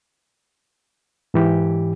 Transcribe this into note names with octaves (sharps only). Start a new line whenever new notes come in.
G#2 E3 G4